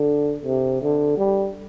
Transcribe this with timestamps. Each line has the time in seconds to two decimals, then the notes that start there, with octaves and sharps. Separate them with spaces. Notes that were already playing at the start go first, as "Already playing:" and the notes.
Already playing: D3
0.45 C3
0.81 D3
1.17 G3